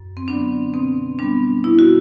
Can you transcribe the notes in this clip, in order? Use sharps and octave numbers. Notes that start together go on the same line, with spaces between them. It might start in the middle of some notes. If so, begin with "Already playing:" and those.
Already playing: F#2
C4
D3 F#3 B3 D4
B2 C4
G3 B3 D4
B2 E4
F#4